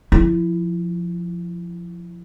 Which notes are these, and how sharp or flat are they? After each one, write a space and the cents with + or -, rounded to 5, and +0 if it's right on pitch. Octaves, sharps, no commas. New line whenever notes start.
F3 +0 E4 +15